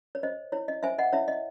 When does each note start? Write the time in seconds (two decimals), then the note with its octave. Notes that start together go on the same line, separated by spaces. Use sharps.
0.15 C#5
0.23 C5 D#5
0.52 E4 C#5
0.68 D#5
0.83 C5 E5 G#5
0.99 D#5 F#5
1.13 E4 C#5 E5
1.28 D#5